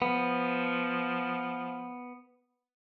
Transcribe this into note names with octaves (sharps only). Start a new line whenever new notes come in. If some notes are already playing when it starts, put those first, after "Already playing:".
F3 B3